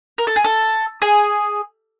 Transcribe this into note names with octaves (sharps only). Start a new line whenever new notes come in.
A#4
A4
G#4
A4
G#4